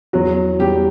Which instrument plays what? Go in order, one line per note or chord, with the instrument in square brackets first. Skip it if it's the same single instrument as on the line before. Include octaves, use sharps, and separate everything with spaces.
[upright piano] E2 F#3 F#4
E2 G3 G4